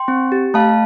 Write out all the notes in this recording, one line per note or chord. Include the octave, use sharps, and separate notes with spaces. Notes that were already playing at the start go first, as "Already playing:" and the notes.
Already playing: G5 C6
C4
G4
A3 F5 A5